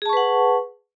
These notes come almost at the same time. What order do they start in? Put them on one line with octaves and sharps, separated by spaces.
G#4 A5 C#6 B4 F#5